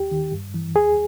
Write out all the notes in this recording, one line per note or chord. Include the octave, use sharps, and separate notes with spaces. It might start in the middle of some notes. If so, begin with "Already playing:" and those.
Already playing: D#2 G4
D#3
G2
E3
D#2 G#4